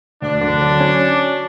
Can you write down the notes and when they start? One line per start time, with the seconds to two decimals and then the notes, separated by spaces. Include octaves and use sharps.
0.22 D2 D4
0.41 D3
0.61 F#3
0.80 C#4